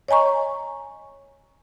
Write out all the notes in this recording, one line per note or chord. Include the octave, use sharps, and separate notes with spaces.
C#5 D#5 G#5 A#5 C#6